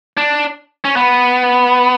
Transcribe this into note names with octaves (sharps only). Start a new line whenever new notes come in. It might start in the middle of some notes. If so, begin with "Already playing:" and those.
D4
C#4
B3